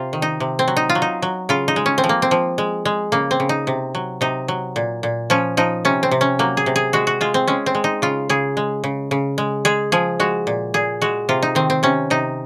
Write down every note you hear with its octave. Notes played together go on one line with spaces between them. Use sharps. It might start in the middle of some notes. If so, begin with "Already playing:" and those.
Already playing: C3 F4
D#3
D#4
C3
C4
F#3
D#4
F4
F#3
D#4
F#3
C#3 F4
D#4
G#3
C#4
C4
F3
A#3
C4
F3
G#3
G#3
C#3 A#3
C4
C#3
D#4
C3
F#3
C3 D#4
F#3
A#2
A#2
F3 C#4
F3 D#4
C3 C#4
C4
C3
C#4
F#3 A#3
G#4
C3
G#4
G#3 F#4
F#4
G#3 F4
C4
G#3 C#4
C4
G#3
D#4
C#3 F4
C#3 G#4
G#3
C#3
C#3
G#3
G#3 G#4
F3 G#4
G#3 F#4
A#2
A#2 G#4
G#3 F#4
C3 F4
D#4
D#3 C4
C4
C3 C#4
C3 D#4